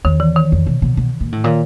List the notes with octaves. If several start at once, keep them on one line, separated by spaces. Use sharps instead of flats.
E2 D#3
E3
D#3
F2
B2
B2
B2
A#2
A2
A#2 D#3